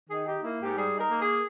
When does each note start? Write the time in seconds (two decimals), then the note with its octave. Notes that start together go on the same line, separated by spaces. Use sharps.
0.09 D#3 G#4
0.26 D#4 G4
0.43 A#3 E4
0.60 G#2 G4
0.76 G3 G#4
0.94 D#4 A#4
1.10 A#3
1.21 G#4